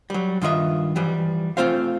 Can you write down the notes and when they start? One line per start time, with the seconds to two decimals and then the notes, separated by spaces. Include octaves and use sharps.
0.10 F#3 G3
0.41 G2 D#3 F4 D#5 E5
0.96 E3 F3 G3
1.57 A3 C4 F4 C5 F5